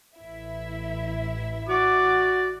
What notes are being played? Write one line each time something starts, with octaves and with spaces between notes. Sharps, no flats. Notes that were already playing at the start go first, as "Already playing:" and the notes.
A1 E4 E5
F#4 D5 D6